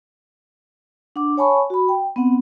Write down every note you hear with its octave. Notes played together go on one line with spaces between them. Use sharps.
D4 F#5 D6
C#5 F#5 G#5 A5 B5 C#6
F#4 B5
G5
B3 C4 F#5